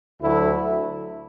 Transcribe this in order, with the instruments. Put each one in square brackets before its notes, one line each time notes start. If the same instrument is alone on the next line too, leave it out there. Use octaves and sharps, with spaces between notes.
[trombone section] D2 D3 F#3 A3 E4